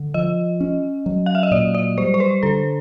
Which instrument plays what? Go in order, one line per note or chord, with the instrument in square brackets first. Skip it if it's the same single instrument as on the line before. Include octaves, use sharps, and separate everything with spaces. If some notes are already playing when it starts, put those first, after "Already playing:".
Already playing: [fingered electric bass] D3
[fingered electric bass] F3 [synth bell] D#5
[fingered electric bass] C#4
F#3
[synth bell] F5
E5
D#5
[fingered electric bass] A#2 [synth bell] D5
[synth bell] D5
[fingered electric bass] G3 [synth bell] C5
[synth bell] C5
B4
[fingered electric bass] D3 [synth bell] A4